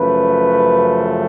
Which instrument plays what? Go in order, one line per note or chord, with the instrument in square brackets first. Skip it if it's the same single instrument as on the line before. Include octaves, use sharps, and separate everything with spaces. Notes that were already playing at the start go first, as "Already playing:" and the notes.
Already playing: [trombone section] F#2 C#3 F3 A3 B4